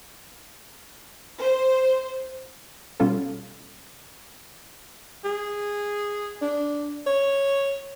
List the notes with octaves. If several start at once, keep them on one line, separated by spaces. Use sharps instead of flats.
C5
B2 G3 C#4 F4 A4
G#4
D4
C#5